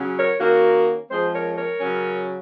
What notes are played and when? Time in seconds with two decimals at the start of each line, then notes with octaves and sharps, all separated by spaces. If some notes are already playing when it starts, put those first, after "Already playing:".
Already playing: C#3 F#3 C#4
0.17 A#4 C#5
0.40 D#3 A#3 C#4 F#4 A#4
1.10 F3 G#3 C4 G#4 C5
1.33 A#4 C#5
1.57 A#4 C#5
1.81 C#3 F#3 C#4